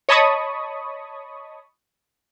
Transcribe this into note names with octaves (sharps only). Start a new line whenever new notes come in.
C#5 D#5 A5 B5 C#6 D#6